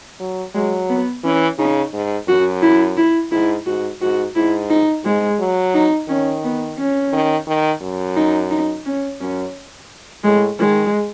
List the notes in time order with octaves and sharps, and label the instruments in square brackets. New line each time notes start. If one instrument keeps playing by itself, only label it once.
[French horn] F#3
[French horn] F#3 [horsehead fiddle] G#3
[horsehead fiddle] B3
[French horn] E3 [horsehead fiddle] C#4
[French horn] C#3 [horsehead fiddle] D#4
[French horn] G#2
[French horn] F#2 [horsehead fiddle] F#4
[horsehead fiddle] E4
E4
[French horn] G#2 [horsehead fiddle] E4
[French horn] G#2 [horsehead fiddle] F#4
[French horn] G#2 [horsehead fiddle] F#4
[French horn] G#2 [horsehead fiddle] E4
[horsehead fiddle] D#4
[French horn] G#2 [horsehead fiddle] G#3
[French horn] F#3
[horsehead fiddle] D#4
[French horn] D#3 [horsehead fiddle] C#4
[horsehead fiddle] B3
C#4
[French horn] D#3
D#3
F#2
[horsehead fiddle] D#4
D#4
C#4
[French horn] F#2 [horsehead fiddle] C#4
[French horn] A2 [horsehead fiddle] G#3
[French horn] D#3 [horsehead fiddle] G#3